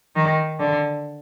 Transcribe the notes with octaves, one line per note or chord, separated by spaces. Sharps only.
D#3
D3